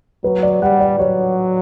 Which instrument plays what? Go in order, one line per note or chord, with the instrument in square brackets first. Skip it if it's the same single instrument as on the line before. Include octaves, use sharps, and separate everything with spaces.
[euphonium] F#3 [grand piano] B4
[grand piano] D5
[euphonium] G3 [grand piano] F#5
[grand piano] D5
[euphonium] F#3 [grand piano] C#5